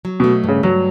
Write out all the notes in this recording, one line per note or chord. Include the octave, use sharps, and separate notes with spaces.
F#3
B2 A3
G2 C#3
G2 F#3